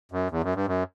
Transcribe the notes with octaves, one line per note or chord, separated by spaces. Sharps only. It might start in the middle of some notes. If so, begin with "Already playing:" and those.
F#2
E2
F#2
G2
F#2